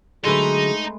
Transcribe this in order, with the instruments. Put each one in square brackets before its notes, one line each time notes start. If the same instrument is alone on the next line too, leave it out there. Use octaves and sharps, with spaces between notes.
[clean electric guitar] D3 F#3 [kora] G#3 A3 B4 [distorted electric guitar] D#4 [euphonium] G#4